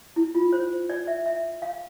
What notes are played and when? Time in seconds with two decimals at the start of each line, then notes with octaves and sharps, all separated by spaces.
0.16 E4
0.35 F4
0.53 C5
0.90 D5
1.07 E5
1.26 E5
1.62 F5